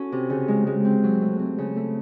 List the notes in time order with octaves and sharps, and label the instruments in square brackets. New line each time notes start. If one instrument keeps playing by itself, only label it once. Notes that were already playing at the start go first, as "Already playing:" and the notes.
Already playing: [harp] C#4 E4 F#4 A4
C3
C#3
G#3
G#3
C4
F#3
A3
C4
C#3
A3